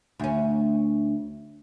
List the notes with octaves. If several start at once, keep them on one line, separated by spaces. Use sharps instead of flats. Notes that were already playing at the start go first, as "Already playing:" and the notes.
D2 C#4